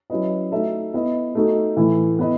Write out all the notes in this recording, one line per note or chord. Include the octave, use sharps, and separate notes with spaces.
F#3 C#4 E4 B4 D#5
A3 D#4 F#4 A4 E5
B3 E4 B4 D#5
A3 D#4 F#4 A4
A2 E3 A3 E4
B3 E4 B4 D#5